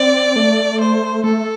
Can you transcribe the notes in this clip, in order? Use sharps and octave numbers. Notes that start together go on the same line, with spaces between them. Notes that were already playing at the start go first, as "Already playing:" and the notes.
Already playing: C4 D5
A3
C5
A3 A4